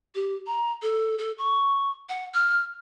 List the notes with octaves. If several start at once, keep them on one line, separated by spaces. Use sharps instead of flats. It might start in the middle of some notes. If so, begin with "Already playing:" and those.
G4
A#5
A4
A4
C#6
F#5
F6